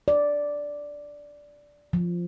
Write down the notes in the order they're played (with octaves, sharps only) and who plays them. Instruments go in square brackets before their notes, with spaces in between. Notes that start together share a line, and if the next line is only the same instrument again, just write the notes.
[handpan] D5
F3